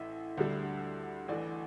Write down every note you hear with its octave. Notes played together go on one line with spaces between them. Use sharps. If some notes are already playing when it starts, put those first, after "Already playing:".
Already playing: A1 A2 E5
D2 D3 G3
A1 A2 E3 D5